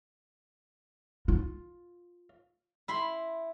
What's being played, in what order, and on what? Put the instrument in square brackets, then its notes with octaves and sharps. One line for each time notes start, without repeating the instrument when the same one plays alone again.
[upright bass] F4
[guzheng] E4 B5 C6